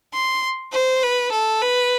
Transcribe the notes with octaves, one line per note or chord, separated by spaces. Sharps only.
C6
C5
B4
A4
B4